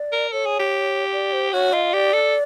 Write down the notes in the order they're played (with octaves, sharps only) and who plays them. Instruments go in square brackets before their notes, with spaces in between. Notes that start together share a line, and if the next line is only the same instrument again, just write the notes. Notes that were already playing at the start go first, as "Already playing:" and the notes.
Already playing: [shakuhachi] D5
[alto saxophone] A#4
[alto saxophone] A4 [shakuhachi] C#5
[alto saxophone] G#4
G4
[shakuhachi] D5
C5
[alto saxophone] F#4 [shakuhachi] C#5
[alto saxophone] F4 [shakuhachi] D#5
[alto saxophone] G4 [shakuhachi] D5
[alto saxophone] A4